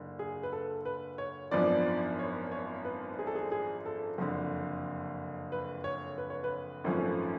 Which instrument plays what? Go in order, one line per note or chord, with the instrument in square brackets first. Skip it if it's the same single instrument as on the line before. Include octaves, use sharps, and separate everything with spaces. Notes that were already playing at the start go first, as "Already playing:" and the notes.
Already playing: [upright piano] F#1 D3
G#4
B4
A4
B4
C#5
G#1 F#2 F3 B3 D4 D5
C#5
C#5
B4
G#4
A4
G#4
G#4
A4
F#1 F2 D3
B4
C#5
B4
C#5
B4
G#1 F#2 F3 A3 C#4